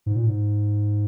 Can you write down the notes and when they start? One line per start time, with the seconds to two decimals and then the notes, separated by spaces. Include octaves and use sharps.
0.06 G#2
0.16 A#2
0.26 G#2